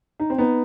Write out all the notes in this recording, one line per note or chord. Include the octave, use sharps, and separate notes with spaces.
D#4
C4
B3 D#4